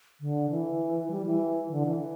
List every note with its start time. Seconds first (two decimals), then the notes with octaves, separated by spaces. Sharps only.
0.20 D3
0.50 E3
1.11 G3
1.26 E3
1.71 D3
1.86 E3